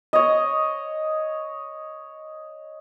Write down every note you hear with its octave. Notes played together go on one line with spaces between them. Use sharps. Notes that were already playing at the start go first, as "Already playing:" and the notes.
C#5 D#5